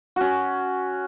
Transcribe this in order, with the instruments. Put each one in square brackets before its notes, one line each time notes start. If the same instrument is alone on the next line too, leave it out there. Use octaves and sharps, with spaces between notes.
[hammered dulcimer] C#4 F#4